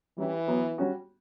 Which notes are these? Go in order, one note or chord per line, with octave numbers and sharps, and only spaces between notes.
E3 G3 C#4 E4 G4
F#3 B3 E4
G3 C#4 F#4